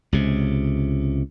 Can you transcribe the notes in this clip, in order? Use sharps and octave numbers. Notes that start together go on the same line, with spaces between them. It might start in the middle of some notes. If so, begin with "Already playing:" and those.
C#2 C3